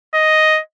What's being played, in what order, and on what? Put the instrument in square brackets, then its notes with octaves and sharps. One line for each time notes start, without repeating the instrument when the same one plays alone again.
[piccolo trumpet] D#5